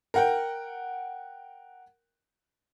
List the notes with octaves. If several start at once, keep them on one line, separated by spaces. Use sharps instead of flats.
A#4 F#5 G5